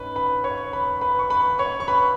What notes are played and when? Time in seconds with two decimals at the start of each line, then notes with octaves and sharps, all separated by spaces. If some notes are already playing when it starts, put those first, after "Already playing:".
Already playing: G#2 C#4 B4
0.16 B4 B5
0.44 C#5 C#6
0.73 B4 B5
1.01 B4 B5
1.19 C#6
1.30 B4 B5
1.59 C#5 C#6
1.80 C#6
1.88 B4 B5